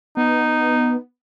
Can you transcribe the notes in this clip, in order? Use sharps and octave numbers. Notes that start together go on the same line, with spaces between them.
B3 D#4